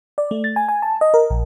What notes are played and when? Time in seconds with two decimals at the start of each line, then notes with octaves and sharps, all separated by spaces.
0.18 D5
0.31 A3
0.44 A6
0.56 G#5
0.69 G#5
0.82 A5
1.01 D#5
1.14 A#4
1.30 A#1